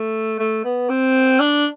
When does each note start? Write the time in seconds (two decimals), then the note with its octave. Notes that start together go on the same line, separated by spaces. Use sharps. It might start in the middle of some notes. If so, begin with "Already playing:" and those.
Already playing: A3
0.39 A3
0.65 B3
0.90 C4
1.40 D4